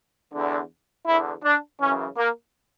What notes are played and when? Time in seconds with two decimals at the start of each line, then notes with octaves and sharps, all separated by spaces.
0.33 E2 D3
1.07 E2 D3 E4
1.44 D4
1.80 F#2 C#3 E3 C#4
2.17 A#3